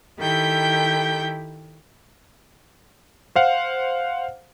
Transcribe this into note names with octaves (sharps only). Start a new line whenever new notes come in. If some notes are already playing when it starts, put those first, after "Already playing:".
D#3 E4 G4 A4 G5 G6
C5 F5 F#5